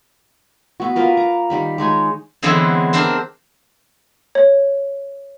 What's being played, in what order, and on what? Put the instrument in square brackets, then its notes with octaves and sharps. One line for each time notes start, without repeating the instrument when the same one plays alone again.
[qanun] B3 F#4
A#3 F4 A#4 B4
A#5
D#3 G3 B5
G#3 D#4 C#5 G#5
[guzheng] D3 E3 F#3 G#3 B3 C4
C4 D4 A#4 C5
[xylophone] C#5